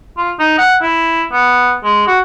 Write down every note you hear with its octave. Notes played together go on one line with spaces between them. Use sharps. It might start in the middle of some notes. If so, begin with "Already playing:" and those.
F4
D#4
F#5
E4
B3
G#3
F#4